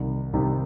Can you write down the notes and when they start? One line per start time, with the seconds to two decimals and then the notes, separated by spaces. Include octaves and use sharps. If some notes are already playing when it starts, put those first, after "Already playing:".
Already playing: C2 C3 D#3
0.33 C2 C3 D#3